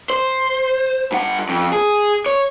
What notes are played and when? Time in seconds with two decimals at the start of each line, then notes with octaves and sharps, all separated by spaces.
0.10 C5
1.12 G2 F#5
1.49 F2
1.72 G#4
2.26 C#5